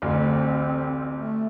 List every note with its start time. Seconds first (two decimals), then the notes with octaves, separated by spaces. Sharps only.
0.02 A1 D2 C4
1.15 A3